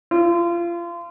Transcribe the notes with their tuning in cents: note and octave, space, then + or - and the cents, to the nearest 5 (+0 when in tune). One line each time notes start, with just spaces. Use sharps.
F4 -30